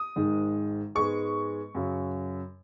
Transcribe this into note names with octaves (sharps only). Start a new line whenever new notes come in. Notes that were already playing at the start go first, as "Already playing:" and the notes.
Already playing: D#6
G#1 G#2 D#3 G#3
G#2 G#3 B3 G#4 C#6
F#2 C#3 F#3